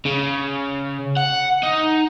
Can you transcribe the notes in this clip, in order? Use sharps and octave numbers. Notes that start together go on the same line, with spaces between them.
C#3
F#5
D#4